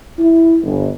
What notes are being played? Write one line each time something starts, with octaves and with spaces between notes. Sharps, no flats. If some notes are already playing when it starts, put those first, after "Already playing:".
E4
G1